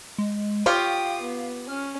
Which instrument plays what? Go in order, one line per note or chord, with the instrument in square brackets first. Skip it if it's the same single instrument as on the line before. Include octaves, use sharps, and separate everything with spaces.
[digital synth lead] G#3
[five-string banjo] F4 G4 C#5 [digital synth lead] F5 [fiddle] G5 D#6
[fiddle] B3
[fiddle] C#4 [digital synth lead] F6